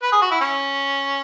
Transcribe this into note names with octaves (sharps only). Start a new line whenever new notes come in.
B4
G#4
F#4
E4
C#4